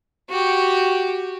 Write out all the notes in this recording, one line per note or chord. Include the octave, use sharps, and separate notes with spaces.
F#4 G4